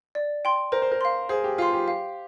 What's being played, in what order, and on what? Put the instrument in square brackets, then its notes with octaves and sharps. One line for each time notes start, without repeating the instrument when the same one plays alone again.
[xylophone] D5
G5 C6
[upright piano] A#4 [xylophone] C5
[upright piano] C5
A#4
[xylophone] F5 C6
[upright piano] G#4 [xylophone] C5
[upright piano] G4
[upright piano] F4 [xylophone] F5 C6
[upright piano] G4
[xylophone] F5